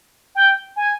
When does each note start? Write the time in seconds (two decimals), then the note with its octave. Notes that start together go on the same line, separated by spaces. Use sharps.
0.35 G5
0.76 G#5